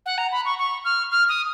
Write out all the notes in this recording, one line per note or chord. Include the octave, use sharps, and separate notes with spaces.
F#5
A#5
B5
C#6
C#6
F6
F6
D#6